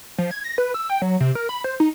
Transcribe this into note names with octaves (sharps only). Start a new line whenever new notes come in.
F3
G#6
A#6
B4
E6
G5
F#3
C3
A#4
B5
C5
D#4